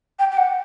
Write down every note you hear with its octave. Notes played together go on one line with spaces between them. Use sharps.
G5
G5
F#5